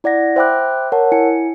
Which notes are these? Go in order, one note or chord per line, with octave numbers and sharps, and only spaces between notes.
E4 D5 F#5 A#6
C5 E5 G5 B5 D6 F#6
A#4 C#5 F#5 A5
E4 G#5 C#7